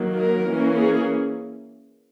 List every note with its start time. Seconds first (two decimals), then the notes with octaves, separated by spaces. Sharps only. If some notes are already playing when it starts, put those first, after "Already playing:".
Already playing: D#3 F#3 A#3
0.15 A#4
0.46 E3 A#3 C#4
0.77 G#4